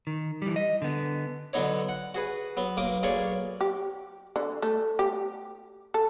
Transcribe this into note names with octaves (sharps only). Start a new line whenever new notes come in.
D#3
E3 G3
D#5
D3 B3
D3 F#3 B3 D#4 C#5
F#5
F#4 G#4 B4
F#3 B3
B1 A#3 D6 D#6
B1 A#3 G#4 C#5 D5 C#6
G4
D3
A3
G4
A4